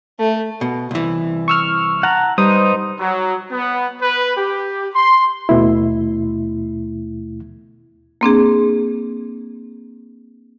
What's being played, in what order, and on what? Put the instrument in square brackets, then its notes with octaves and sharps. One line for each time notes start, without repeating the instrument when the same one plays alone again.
[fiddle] A3
[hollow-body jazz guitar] B2
C2 E3
[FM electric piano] C#6 E6 F6
[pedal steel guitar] F#5 A5 A#5
[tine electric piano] G3 [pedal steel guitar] D#4 B4 C5 [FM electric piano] D#6
[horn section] F#3
B3
B4
G4
C6
[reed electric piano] D#2 B2 A3 E4
[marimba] A#3 C4 D4 G#4